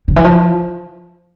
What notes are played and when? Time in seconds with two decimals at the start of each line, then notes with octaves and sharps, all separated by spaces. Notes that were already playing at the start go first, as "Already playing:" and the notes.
0.08 D3
0.16 E3
0.24 F3